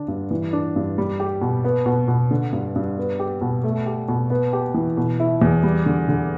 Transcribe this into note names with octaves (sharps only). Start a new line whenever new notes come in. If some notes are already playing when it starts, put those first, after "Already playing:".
Already playing: D3 D4
G2
E3
D4
G2
G3
G4
B2
B3
B2
B2
D3
G2
G2
B3
G4
B2
A3
G4
B2
B3
G4
E3
B2
E4
E2
G3
D3
D3